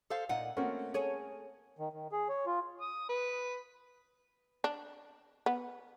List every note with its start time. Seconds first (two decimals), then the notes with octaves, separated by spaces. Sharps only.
0.10 A4 C5 F5
0.29 A#2 D#4 F4 F#5
0.57 A3 A#3 C4 C#4 F#4
0.94 G#4 A4 C#5
1.79 D#3
1.93 D#3
2.12 G#4
2.29 C#5
2.46 F4
2.81 D#6
3.09 B4
4.64 D4
5.46 B3